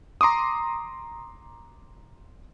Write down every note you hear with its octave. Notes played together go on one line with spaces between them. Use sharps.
A#5 C6 D6 D#6